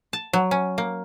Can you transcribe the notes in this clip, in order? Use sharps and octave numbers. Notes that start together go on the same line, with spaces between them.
A5
F#3
C#4
A#3